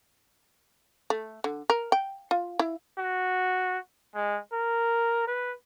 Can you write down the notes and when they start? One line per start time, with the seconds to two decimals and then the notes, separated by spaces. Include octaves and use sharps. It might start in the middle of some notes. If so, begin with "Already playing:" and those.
1.10 A3
1.44 D3
1.70 A#4
1.92 G5
2.31 F4
2.59 E4
2.99 F#4
4.15 G#3
4.53 A#4
5.27 B4